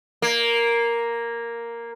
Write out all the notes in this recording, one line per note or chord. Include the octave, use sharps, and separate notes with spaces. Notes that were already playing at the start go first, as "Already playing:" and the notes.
A#3